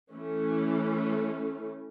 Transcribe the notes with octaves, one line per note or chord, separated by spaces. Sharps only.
E3 A3 C#4